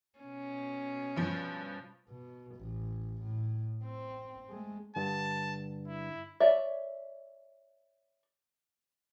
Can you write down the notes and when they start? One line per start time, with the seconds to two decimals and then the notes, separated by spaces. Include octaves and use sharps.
0.20 B2 C#4
1.16 G2 F3
2.09 B2
2.56 A1
3.23 A2
3.85 C4
4.50 G#3 A3
4.96 G2 D3 A5
5.88 E4
6.40 C#5 D5 E5